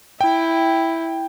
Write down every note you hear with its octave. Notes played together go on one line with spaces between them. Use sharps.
E4 G5